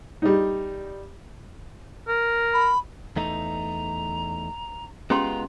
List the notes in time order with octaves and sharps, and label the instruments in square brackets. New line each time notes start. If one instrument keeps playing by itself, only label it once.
[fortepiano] G3 D#4
[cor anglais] A#4
[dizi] B5
[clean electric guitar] E2 A3 D#4 [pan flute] A#5
[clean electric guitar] G#3 B3 F4 [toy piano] C#4 G4 C6 [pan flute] A#5